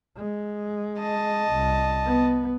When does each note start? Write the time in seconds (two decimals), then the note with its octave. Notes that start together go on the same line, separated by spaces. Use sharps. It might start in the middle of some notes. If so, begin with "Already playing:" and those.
0.17 G#3
1.00 D#5 A5
1.51 C2
2.06 B3